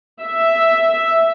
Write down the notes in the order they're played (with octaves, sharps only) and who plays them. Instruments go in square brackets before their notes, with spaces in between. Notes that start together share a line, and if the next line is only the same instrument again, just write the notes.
[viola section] E5